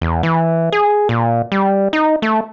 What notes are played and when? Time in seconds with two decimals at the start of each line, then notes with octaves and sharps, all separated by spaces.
0.01 E2
0.23 E3
0.72 G#4
1.09 A#2
1.52 G3
1.93 D#4
2.22 A3